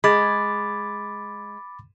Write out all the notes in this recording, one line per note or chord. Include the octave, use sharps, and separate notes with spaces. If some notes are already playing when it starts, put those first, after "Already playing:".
G#3 B5 D6 A6